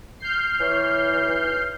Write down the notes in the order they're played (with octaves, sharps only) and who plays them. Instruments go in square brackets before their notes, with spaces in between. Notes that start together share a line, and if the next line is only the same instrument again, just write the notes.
[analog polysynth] F6 G6 C7
[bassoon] E3 [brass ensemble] C#5
[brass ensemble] B1 C#5